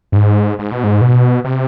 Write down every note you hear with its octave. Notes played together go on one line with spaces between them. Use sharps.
G2
G#2
G#2
B2
G#2
B2
C3